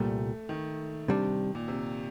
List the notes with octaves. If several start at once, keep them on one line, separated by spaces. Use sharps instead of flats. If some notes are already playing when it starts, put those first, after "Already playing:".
Already playing: C2 A#2 G3 A3
D#3
C3 G3 D4
A#2
C3